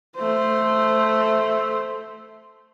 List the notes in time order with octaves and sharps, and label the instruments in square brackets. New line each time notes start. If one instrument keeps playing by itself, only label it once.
[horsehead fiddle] A3 C5